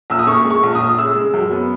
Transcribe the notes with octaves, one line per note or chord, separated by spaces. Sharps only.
A#1 E6
D#6
A#2 C#6
G#3
C#6
A#1
D#6
A#1
C#3 E6
G#3
F#2
B3